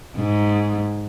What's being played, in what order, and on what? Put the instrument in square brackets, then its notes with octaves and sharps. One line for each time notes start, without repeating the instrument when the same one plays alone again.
[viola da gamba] G#2